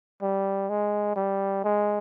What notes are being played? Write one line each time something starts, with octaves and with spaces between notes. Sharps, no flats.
G3
G#3
G3
G#3